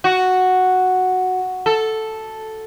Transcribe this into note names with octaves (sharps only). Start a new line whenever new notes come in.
F#4
A4